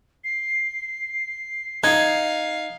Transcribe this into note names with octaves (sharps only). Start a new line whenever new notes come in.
C7
D#4 F5 G#6